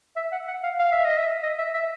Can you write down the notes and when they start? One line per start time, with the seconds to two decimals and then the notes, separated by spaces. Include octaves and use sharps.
0.16 E5
0.32 F#5
0.47 F#5
0.63 F5
0.79 F5
0.92 E5
1.05 D#5
1.17 E5
1.43 D#5
1.58 E5
1.74 E5